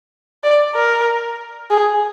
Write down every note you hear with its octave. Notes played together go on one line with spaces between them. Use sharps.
D5
A#4
G#4